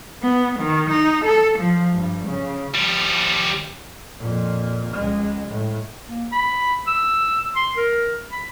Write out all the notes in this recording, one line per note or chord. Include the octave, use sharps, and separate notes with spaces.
B3
D#3
D#4
A4
F3
G2
C#3
F3 G3
F2 A#2
C#2 G#3
A2
A#3
B5
E6
C6
A#4
B5